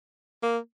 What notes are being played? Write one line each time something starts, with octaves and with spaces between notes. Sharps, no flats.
A#3